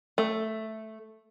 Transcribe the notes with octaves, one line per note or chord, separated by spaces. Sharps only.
A3